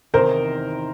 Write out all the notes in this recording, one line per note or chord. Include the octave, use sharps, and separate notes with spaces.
E2 C3 D#3 A#4 C5